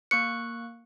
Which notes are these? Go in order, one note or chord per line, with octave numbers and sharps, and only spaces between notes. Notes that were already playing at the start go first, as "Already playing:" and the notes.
A#3 C#6 F#6 C#7